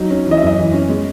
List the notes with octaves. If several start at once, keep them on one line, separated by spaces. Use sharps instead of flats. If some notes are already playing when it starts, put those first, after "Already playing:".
Already playing: F#3 D#4
C#4
E3
D#5
E5
F#2 D#5
E3
C#4
G#3